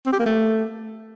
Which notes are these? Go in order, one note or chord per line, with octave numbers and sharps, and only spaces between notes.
C4
G4
A#3
A3